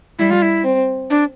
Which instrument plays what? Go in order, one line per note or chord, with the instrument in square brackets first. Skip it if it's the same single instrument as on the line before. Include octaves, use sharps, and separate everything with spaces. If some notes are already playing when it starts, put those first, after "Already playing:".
[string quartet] G3 [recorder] E4
[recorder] F4
E4
[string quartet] C4
[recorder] D4